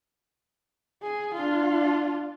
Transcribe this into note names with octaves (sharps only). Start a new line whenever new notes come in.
G#4
D4 F4